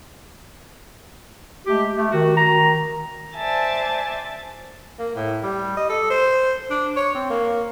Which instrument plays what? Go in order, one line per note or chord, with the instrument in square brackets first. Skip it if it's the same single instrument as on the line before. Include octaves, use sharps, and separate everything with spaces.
[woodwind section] G#3 A3 G4
A3
D#3 F#4
D#3 A#5
[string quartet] C5 D5 E5 G#5 A5
[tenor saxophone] A#3
A2
G3
D#5
A4
C5
D4
C#5
C4
A#3